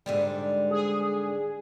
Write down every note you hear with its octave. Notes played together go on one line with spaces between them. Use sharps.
G#2 D3 G3
G#4